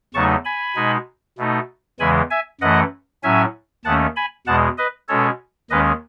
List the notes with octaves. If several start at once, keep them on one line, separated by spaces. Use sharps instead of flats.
E2 C#3 F#3 A3 D#4 A5 C#6
G#5 B5
B2 G#3 D#4
B2 A3 D#4
E2 C#3 E3 G#3 G#5 B5
E5 G#5
F#2 E3 A3 D#5 F#5
A2 F#3 C#4 E5 G#5
D#2 D#3 A3 C#4 F#5 A5
G#5 B5
E2 B2 G#3 F#5 A5
B4 D#5
B2 G#3 C#4 A4 C#5
D#2 D#3 G#3 C#4 B4 D#5